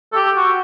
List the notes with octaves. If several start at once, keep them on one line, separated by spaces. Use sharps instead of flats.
A4
G4
F#4